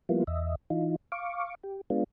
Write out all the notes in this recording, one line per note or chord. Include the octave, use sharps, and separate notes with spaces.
F3 G3 A#3 B3 E4 F4
E2 D#5 E5
E3 D#4 F4
F5 C#6 D6
G4
G#3 B3 D4 F4